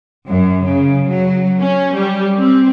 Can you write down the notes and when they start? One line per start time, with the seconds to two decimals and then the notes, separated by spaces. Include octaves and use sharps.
0.27 F#2
0.64 C#3
1.10 F#3
1.61 C#4
1.95 G3
2.38 C4